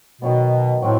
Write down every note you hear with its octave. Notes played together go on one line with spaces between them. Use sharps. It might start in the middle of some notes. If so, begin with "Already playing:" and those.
B2 D#3 F#3 B3
A2 F#3 C4